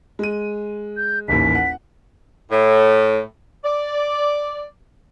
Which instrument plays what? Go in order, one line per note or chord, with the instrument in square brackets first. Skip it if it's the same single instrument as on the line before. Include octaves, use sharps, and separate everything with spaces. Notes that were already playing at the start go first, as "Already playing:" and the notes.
[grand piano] G#3 D#7
[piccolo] G6
[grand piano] D#1 A1 D#2 [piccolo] B6
[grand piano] F#5
[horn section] A2
D5